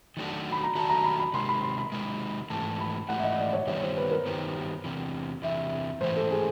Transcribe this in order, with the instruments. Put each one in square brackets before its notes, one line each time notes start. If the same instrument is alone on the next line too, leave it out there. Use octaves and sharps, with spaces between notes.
[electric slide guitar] D#3 F#3 A3 D4 F#4
[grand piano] B5
A#5
[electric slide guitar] D#3 F#3 A3 D4 F#4 [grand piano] A5
[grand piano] A#5
B5
B5
[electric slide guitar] C3 D#3 G#3 [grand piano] C6
[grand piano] B5
C6
B5
[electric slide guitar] C3 D#3 G#3
[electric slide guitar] G#2 E3 A3 [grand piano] A5
[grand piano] B5
[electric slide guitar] G#2 E3 A3 [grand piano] F#5
[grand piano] E5
D#5
D5
C#5
[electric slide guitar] G2 D#3 G3 B3 [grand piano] C#5
[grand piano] C5
B4
A#4
[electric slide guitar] G2 D#3 G3 B3
E2 C3 E3
[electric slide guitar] E2 C3 E3 [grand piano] E5
[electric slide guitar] G#2 E3 A3 [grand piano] C5
[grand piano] A4
G#4